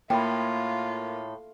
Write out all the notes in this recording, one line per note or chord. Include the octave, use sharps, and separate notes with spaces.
A2 A#3 F4 G5 B5